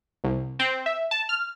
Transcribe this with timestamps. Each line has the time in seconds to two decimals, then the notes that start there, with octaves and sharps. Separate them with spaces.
0.24 C2
0.59 C4
0.86 E5
1.11 A5
1.29 F6